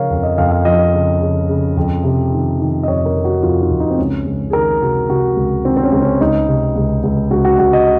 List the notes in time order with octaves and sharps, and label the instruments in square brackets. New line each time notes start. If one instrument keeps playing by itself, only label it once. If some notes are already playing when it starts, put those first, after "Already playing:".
Already playing: [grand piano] C#3 F3 A#4 C#5 F5
F2
D#5
F2 F5
F5
F3 D#5
C#3
C#3
C#3
F2
C3
D#3
D#3
D#5
F2 C#5
A#4
F2
F#4
F2 F4
D#4
F2
D#4
C4
C#2 C#4
C#2
G#4
D#3 A#4
C3 F#4
C3 F#4
C#2
D#3 C4
C4
C#4
C#2
C#4
C#2 D#4
C3
C#2
C#2
C#2 F#4
F#4
C#2 F#4
D#5